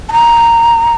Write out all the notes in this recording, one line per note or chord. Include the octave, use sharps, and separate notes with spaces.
A5
A#5